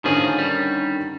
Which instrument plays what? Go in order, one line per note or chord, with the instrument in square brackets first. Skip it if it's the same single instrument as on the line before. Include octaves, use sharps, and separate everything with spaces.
[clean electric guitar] A2 F3 G#4 [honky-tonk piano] D3 D#3 C#4
[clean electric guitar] G3